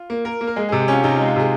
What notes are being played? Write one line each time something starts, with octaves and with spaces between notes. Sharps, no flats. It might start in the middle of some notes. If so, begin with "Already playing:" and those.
Already playing: F4
A#3
A#4
A#3
A#4
G#3 G#4
G#4
C3
G4
C#4 F4
C3 D#4
F4
G#3
F4
C3 G#4